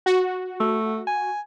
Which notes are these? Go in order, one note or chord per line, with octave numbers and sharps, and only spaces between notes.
F#4
A3
G#5